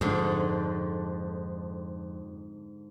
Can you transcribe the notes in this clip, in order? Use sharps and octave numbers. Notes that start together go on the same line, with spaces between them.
F2 G#2 D3